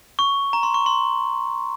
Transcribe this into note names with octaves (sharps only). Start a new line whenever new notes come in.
C#6
A#5
C6
C#6
C6